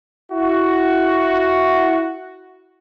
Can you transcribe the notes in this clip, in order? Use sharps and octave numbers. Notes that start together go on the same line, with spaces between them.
E4 F#4